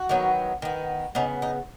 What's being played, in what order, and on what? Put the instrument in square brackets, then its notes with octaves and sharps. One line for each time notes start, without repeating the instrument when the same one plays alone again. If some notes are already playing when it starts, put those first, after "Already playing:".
Already playing: [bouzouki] F#4
D#3 F#3 B3
D#3 B3
C#3 B3 D#4
D#4